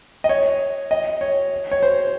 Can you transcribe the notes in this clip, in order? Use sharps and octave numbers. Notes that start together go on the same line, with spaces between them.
D#5
C#5
D#5
C#5
C#5
C5